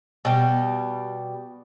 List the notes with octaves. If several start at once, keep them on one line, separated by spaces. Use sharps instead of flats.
B2 G3